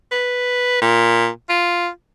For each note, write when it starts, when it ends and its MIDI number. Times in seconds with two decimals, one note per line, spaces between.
0.12 0.81 71
0.81 1.28 46
1.49 1.88 65